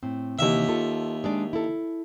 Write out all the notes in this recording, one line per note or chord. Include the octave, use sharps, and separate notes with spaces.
A2 C4
D#2 C3 E3 A#3 E5
F4 A4 A5
G#3 D4 D5
E4 A4